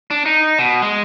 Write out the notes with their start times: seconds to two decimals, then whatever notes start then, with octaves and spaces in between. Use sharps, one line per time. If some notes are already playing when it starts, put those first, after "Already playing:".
0.11 D4
0.26 D#4
0.59 B2
0.82 G#3